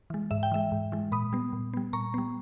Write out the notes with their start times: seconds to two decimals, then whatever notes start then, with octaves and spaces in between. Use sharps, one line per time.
0.10 E3 G#3
0.31 G#2 E5
0.43 G5
0.52 E3 G#3 E5
0.72 G#2
0.92 E3 G#3
1.12 A#2 B5 D#6
1.33 G3 B3
1.53 A#2
1.74 G3 B3
1.93 A#2 A#5 C#6
2.14 G3 B3